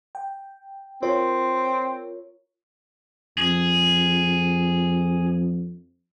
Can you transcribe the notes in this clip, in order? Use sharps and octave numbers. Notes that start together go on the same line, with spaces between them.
G5
C4 F4 A#4 C#5
F2 G#4